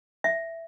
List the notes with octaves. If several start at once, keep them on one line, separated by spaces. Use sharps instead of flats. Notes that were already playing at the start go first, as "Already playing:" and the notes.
E5